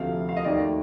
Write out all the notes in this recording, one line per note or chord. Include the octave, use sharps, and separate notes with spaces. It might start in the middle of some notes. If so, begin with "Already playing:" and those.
Already playing: D2 C3 F3 A3 F5
F5
D#5
D#2 D#3 A3 D5